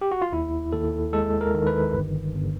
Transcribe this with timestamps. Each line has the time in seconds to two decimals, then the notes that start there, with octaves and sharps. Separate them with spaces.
0.01 G4
0.11 F#4
0.22 F4
0.32 D#2 E4
0.72 D#2 A4
1.13 G#3 A4
1.41 A#4
1.54 D#3
1.67 B4
1.94 G1
2.34 G1